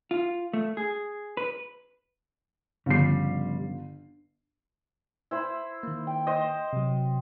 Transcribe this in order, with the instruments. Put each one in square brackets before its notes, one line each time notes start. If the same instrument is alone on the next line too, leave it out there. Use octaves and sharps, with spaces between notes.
[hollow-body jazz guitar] F4
A3
G#4
B4
[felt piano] G1 C7 [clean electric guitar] C#3 F3 G3
[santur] E4 C5 B5
[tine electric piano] D#3 A#3
[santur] G5
C5 D#5
[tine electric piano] C3 F#3